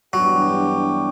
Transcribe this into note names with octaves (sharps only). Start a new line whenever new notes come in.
G2 E3 F#3 B3 D4 G4